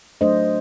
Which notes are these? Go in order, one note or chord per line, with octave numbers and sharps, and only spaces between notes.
F#3 A3 D4 C5 D#5